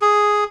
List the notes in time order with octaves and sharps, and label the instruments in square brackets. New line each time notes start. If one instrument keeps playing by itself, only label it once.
[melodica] G#4